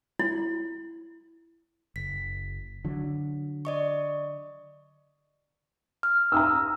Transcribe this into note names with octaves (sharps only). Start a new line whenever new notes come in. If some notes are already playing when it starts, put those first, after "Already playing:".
E4
F#1 B6
D3 F#3
D5 D#5 C#6
F6
A#5 D#6 E6